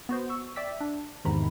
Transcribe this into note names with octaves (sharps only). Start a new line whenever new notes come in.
B3 F#4 C5
C#6 E6
D5 E5 G5 D6 E6 B6
D4
E2 G#2 C3 D#3 A#5 B5